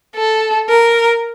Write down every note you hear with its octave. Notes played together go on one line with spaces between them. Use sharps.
A4
A#4